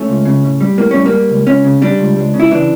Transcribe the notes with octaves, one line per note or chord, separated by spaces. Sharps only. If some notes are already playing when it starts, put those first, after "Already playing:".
Already playing: A3 C#4
C#2
C#3
A2
G3
A2 A#3
G3 C#4
A#3
G3
C#2
C#2 C#4
C#3
G3 D4
C#2
C#2
C#3
E4
E3 D4